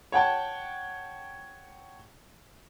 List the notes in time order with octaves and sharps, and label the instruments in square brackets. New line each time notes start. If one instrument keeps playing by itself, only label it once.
[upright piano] C#5 F#5 G5 A5